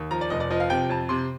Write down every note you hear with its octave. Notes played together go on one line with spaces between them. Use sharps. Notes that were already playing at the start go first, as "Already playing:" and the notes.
Already playing: D#2
F3 A#5
D5
F1 D#5
D5
F3 D#5
F5
C3 G5
F2 A5
C3 C6